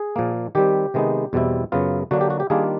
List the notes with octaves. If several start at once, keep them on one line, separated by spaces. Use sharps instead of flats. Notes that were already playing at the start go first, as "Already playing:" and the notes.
Already playing: G#4
A#2 F3 A#3
D#3 G3 C4 G4
C3 D#3 G#3 B3 D#4
E2 B2 G3 C4 E4
F#2 C#3 F#3 B3 F4
D3 F#3 A#3 D4 F#4
G4
F#4
G4
D#3 G3 A#3 D4 F4 G#4